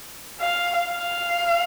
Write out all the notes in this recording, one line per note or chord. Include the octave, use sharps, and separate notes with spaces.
F5
F5